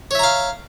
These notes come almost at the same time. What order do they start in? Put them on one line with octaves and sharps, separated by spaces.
C#5 E5 A#5 F5